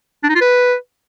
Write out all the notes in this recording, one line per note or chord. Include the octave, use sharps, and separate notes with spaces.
D4
D#4
F4
B4